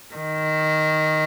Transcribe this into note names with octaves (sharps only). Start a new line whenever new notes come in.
D#3